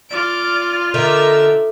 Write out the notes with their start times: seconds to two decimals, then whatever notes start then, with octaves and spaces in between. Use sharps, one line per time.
0.11 F4 D5 D6 F6
0.94 D3 D#4 A#4 E5